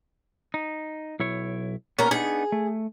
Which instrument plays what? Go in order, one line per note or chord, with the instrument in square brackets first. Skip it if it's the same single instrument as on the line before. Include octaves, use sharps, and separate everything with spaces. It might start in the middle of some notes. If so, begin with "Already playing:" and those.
[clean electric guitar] D#4
B1 E4 C#5
[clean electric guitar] A#3 B3 [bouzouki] C#4 A#4
[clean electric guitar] B3 D4 D#4 [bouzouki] G#4
[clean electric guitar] A3